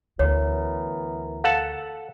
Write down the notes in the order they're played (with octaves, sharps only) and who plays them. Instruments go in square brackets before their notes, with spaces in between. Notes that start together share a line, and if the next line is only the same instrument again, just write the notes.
[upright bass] D2 [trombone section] E3 B3 A#4 [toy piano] C#5
[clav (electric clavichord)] A4 F#5 A5 [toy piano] F5